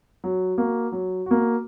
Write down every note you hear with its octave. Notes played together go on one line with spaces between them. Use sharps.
F#3
A#3 F#4
F#3
A#3 F#4